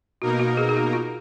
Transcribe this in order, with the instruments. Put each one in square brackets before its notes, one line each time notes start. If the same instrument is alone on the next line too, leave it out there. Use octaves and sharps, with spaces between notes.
[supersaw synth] B2 A#3 D#4 A#4 [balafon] F#4
[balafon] F#4
G#4
G#4
F#4
F4